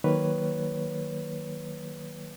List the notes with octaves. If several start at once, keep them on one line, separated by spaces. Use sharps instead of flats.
D#3 F#3 A#3 B4 C#5